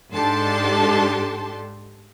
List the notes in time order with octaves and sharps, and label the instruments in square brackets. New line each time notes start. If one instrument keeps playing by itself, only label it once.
[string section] G#2 D4 G4 A4 A5 C6